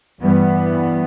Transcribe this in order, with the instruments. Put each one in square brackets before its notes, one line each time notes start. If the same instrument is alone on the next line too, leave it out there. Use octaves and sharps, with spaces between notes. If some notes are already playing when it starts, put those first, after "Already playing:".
[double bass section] G2 E3 G3 B3